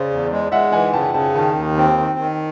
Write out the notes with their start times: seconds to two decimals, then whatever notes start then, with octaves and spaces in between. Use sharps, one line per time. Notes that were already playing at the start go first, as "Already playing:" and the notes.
Already playing: C#3 C5 D5
0.10 E2
0.31 G#3
0.52 G#3 E5 F#5
0.72 E3 F#5 G#5
0.93 C#3 G5 A5
1.14 C#3 G5 A5
1.35 D#3 G5 A5
1.56 D#2
1.77 C4
1.98 D#3
2.19 D#3